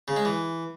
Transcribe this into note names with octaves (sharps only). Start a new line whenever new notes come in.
C#3
G#3
E3